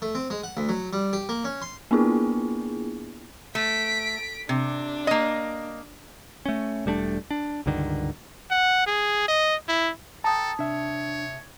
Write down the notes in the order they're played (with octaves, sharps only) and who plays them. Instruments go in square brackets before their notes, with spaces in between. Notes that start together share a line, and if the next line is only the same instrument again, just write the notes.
[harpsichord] A3
C4
G#3
F#5
D2
F#3
G3
G4
A#3
C#4
C6
[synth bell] A#3 B3 D4 E4 F4 G#4
[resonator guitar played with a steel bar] A3 [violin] B6 D7
[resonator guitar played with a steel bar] C3 [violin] D4
[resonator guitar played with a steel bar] A#3 D#5
[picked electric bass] A3 C#4
E1 G3 A3 D4
D4
C#2 G2 D3 D#3
[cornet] F#5
G#4
D#5
E4
[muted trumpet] A4 [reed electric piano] G5 A#5 [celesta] A5 D#6
[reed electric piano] C3 E5 [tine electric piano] D4 [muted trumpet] C#5